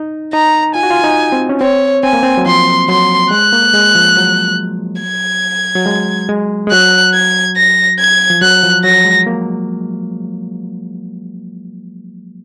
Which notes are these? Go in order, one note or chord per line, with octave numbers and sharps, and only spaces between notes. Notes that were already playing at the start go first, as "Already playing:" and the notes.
Already playing: D#4
D#4 A#5
F4 G#5
F#4
F4
D#4
C4
C#4
C4 C#5
C4 G#5
A#3
C4
F#3
F3 C6
F#3 C6
G#3 F#6
A#3
G#3
F3
F#3
G#6
F#3
G#3
G#3
G#3
F#3 F#6
G#6
A#6
G#6
F3
F#3 F#6
F3
F#3 A#6
G#3
A#3